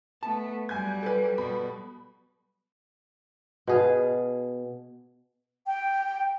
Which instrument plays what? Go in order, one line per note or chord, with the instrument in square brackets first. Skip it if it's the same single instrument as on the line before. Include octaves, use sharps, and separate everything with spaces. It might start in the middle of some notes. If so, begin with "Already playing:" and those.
[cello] A3 B3 [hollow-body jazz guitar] A5
[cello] F#3 G3 [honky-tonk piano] G#5 G6 G#6
[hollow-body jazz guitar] A4 B4
[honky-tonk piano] B2 B5
[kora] B2 G#4 F5
[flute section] G5